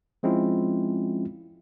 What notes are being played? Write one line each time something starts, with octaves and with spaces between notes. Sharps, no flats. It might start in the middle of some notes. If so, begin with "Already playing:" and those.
F3 G#3 C4 C#4 E4 F4